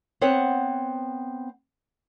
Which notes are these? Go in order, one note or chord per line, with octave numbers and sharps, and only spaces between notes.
B3 C4 C5 C#5 F#5